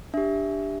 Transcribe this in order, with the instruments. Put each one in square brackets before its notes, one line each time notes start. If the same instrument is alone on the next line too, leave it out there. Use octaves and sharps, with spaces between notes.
[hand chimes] D4 G4 E5